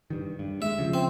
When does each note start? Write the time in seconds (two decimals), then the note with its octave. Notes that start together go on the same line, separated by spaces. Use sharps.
0.10 G2 D#3
0.39 G2
0.62 G#3 E5
0.78 C#3 F3
0.94 C4